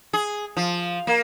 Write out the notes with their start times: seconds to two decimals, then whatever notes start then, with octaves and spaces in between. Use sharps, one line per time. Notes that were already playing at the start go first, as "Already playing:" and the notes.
0.13 G#4
0.57 F3
1.07 A#3